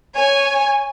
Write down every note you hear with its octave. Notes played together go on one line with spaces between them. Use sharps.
C#5 G#5